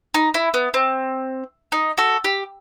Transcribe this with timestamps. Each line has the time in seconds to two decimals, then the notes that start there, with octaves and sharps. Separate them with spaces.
0.14 D#4
0.34 E4
0.54 B3
0.74 C4
1.72 D#4
1.98 F#4 A4
2.24 G4